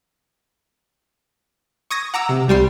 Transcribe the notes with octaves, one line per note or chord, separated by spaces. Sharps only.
C#6 D#6 G#6 A#6
F#5 A#5 D6 E6
C3
C2 G3 G5 C6